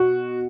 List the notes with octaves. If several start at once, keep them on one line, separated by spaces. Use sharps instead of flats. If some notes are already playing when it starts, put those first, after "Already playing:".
Already playing: B2 F#4